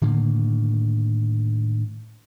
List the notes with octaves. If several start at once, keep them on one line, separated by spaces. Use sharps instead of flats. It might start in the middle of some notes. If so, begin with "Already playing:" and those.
A2 D3 D#3 A#3